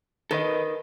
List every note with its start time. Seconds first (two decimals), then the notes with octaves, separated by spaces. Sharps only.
0.31 D#3 A4 B4 D#5